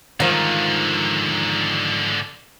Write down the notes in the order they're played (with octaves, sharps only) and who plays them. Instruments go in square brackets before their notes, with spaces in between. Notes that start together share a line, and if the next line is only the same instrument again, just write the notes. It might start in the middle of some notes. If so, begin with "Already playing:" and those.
[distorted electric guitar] G#2 D3 [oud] D#3 F3